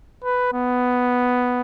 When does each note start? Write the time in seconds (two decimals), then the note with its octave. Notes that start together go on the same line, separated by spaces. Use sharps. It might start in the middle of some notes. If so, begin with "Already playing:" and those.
0.24 B4
0.53 B3